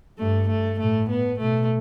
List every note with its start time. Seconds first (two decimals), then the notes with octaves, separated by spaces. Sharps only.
0.18 G2 A3
0.48 A3
0.79 A2 A3
1.09 B3
1.39 B2 A3